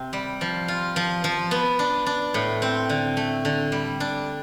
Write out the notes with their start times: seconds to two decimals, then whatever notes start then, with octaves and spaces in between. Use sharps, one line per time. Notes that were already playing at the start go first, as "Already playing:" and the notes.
Already playing: C3 C4
0.13 G3
0.41 F3
0.68 F4
0.96 F3
1.24 F3
1.51 B3
1.79 D4
2.06 D4
2.34 A2
2.62 C4
2.89 D3
3.17 A3
3.45 D3
3.72 G3
4.00 D4